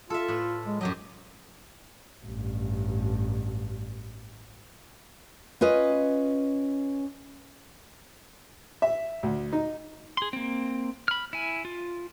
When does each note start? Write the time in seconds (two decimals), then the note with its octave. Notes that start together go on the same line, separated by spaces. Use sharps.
0.10 F4 A4 E5
0.28 A2 B4
0.67 G#3
0.81 F#2 F#3 G4 D#5
2.25 A1 G2
5.61 C#4 F4 B4 D#5
8.82 E5
9.23 D2
9.53 D#4
10.17 G#4 C6
10.33 A#3 C4
11.08 B5 F6
11.33 E4 G#5
11.65 F4